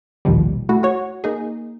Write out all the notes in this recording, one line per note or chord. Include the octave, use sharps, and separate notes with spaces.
A#1 D#2 B2 D#3 F3 G3
A3 E4 F#4
F#4 C#5
A#3 D#4 G#4